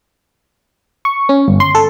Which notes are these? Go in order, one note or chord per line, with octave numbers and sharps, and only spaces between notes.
C#6
C#4
G1
C6
A4